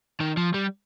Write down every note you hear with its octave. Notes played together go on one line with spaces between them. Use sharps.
D#3
F3
G3